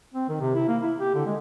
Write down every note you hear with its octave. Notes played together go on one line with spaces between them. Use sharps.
C4
D#3
C3
E4
A#3
E4
G4
D3
G#3